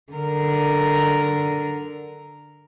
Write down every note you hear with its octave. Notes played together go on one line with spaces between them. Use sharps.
D3 A#4